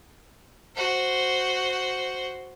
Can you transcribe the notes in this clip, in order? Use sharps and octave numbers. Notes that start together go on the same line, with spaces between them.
F#4 C5